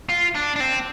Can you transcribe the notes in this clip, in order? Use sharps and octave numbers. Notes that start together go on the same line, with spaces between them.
F4
D4
D4
C4